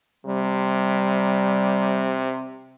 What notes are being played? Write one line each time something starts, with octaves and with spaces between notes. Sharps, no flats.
C3 G3